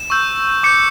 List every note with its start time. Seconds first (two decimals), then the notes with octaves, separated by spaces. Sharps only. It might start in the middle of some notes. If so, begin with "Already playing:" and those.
Already playing: E7
0.10 C#6 E6 G6
0.63 D6 G6 C#7